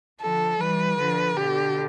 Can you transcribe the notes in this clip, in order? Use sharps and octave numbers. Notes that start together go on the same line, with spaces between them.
D3 F3 A4
E3 G3 B4
D3 F3
B2 D3 G4